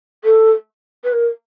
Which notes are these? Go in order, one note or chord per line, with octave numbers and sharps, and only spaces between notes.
A4
B4
A#4